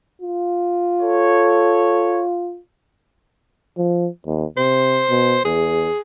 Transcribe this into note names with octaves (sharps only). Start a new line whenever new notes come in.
F4
A4 C#5
F3
D#2
C3 C5
B2
E2 G#4